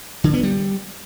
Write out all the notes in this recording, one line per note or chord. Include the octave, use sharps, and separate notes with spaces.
D3
B3
G3